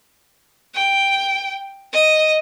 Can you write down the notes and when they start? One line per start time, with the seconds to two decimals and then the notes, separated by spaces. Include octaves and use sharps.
0.74 G5
1.93 D#5